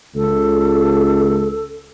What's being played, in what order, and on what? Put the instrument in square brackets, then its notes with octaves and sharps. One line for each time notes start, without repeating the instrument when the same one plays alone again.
[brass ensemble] C#2 [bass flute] A4